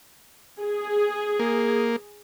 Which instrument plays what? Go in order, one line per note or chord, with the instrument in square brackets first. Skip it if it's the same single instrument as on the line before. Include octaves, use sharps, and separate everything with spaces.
[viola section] G#4
[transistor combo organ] A#3